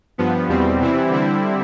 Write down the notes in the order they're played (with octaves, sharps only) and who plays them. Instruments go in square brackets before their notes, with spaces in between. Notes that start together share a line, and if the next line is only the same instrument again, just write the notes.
[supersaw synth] G2 F3 B3
E2 B2 G3 C4
C3 E3 G3 C4 E4
D3 G3 C4 E4